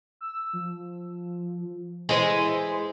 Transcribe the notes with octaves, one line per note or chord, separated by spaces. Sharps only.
E6
F3
E3 G#3 C5